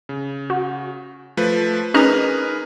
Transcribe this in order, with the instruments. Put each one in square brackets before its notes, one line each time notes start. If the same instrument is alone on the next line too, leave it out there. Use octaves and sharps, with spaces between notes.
[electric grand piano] C#3
[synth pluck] F#4
[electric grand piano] F3 A3 B4
[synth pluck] C#4 D#4 F6 [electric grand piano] G#4 A#4 B4